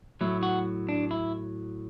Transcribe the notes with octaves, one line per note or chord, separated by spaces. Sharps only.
A2 F#3 E4
F#4
D4
E4